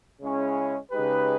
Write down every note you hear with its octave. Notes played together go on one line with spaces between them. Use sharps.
C#3 G#3 C#4 E4
C#3 G#3 D#4 G4 B4